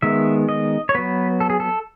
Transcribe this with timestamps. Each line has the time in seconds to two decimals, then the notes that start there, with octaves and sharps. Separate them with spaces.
0.02 D#3 G#3 B3 E5
0.49 D#5
0.89 C#5
0.95 F#3 B3 B4
1.40 A4
1.50 G#4
1.60 A4